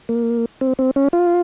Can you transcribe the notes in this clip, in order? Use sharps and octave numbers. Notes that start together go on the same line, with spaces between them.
A#3
C4
C4
C#4
F4